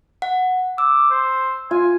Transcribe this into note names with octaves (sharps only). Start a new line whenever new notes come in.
F#5
D6 E6
C5
F4 G#5